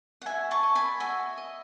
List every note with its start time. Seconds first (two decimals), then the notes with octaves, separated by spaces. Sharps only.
0.22 F#5
0.26 F#4 E5 G#5
0.51 A5 C#6
0.63 D#5
0.75 G#5 B5
1.00 F#4 E5 G#5
1.38 D#5